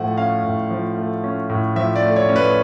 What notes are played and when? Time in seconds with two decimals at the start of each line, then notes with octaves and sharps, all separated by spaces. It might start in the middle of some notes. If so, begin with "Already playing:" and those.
Already playing: A2 F3 A3 F#5
0.17 C#4 F5
0.44 A2
0.71 F3
0.97 A3
1.24 C#4
1.49 A2
1.76 F3 E5
1.96 D5
2.02 A3
2.16 C#5
2.29 C#4
2.36 B4